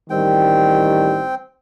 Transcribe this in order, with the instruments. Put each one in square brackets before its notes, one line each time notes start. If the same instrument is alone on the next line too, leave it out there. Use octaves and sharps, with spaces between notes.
[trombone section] A1 D#3 G3 [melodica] C4 G5